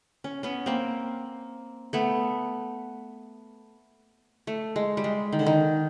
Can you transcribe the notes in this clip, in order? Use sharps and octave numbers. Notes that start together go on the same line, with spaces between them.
C#4
B3 C#4
A#3 C4
A3 B3
A3
G#3
G3
G#3
D#3
D3
D#3